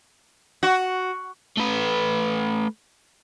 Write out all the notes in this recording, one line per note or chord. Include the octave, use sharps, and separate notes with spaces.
F#4
A3 B4